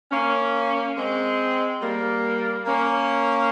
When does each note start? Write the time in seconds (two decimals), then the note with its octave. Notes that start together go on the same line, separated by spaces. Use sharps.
0.12 A#3 C#4
0.96 G#3 C4
1.82 G3 A#3
2.66 A#3 C#4